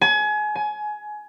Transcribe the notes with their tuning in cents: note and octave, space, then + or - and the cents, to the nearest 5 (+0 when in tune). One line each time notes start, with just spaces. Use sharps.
G#5 +30
G#5 +20